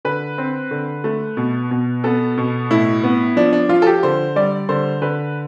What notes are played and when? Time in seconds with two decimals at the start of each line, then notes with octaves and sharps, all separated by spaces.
0.05 D3 B4
0.38 C4
0.71 D3
1.04 A3
1.37 B2
1.71 B2
2.04 B3 A4
2.38 B2
2.71 A2 E4
3.04 B3
3.36 F3 D4
3.53 D4
3.69 F3 F4
3.82 A4
3.87 G4
4.03 D3 C5
4.36 G3 D5
4.69 D3 C5
5.02 D3 B4